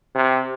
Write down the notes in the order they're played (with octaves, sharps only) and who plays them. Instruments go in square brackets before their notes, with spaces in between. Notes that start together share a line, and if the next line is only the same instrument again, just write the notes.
[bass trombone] C3